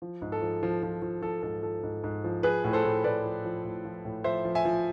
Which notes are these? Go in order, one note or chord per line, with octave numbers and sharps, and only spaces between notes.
F3
G#2
A4
F3
F3
F3
F3
F3 A4
G#2 A4
F3 A4
G#2
G#2
F3
F3 G#4 B4
A2
A4 C5
A2
A2 B4 D5
F3
F3
A2
F3
A2
F3 C5 E5
F3
E5 G#5
F3